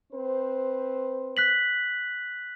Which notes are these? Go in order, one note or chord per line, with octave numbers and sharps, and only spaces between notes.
C4 B4 C5
F#6 B6 F#7